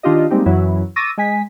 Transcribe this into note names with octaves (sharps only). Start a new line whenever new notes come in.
D#3 D4 F4 G4 D#5
G3 G#3 A#3 C4 D#4 G4
F#2 E3 F#3 E4
C#6 D6 E6 A6 A#6 D#7
G#3 G#5 B6